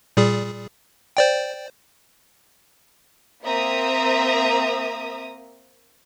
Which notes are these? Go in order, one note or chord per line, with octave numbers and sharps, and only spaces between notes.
A#2 G3 G#4
C5 D5 G5
A#3 C4 E5 A#5 D#6